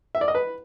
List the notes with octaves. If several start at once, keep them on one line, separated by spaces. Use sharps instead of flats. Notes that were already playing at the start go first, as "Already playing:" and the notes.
E5
D5
D#5
B4